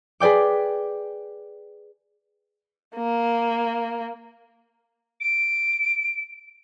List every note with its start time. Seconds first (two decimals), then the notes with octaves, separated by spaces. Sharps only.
0.20 G#4 B4 D5 G5 D6
2.96 A#3
5.20 D7